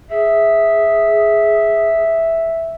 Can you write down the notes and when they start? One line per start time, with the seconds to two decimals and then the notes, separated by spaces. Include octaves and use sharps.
0.11 G#4 E5